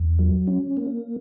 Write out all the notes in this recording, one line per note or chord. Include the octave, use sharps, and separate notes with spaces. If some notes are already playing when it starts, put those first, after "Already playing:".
Already playing: E2
F#3
C#4
A#3